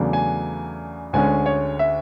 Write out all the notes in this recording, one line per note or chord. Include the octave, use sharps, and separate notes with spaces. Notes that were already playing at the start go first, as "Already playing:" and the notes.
Already playing: E2 C#3 F#3 A3 D4
G#5
D2 D3 G#3 C#4 G#5
C#5
E5